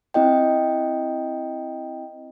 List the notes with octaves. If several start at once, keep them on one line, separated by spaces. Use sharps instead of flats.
C4 E4 D#5 G5